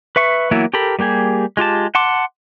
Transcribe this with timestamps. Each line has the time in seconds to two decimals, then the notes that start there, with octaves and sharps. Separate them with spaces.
0.16 B4 E5 C#6
0.51 E3 F#3 A#3 B3 E4
0.74 G4 A4 A#4 B5
0.99 G3 A#3 G4 G#4
1.57 G#3 F4 G4 A5
1.95 F#5 A5 C6 D6